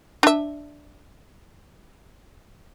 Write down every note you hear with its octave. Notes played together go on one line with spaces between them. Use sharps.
D4 E5